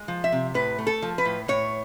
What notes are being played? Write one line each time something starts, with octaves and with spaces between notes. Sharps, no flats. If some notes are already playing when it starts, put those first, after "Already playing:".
Already playing: G#3
F3
E5
C3
A2 B4
A3
A4
F3
B4
A2
A2 C#5